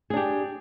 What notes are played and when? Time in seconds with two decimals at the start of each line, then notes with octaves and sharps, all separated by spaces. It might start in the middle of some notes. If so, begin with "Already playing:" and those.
0.10 G#4
0.13 D4
0.17 G4